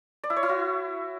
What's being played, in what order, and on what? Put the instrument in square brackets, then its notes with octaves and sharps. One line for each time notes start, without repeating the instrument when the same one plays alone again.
[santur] D5
E4
C#5
E4
F#4